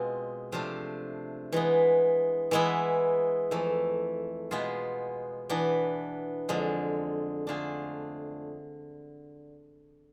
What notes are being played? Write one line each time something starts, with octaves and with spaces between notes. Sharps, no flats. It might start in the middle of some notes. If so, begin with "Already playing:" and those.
Already playing: B2 G#3 C4 F4
C3 F3 A3 D4 F4
E3 G#3 B3
E3 G#3 B3 E4
F2 E3 A3
B2 G#3 B3 F4 G#4
E3 B3 D4
F2 D3 G#3
D3 A3 D4 F4 G#4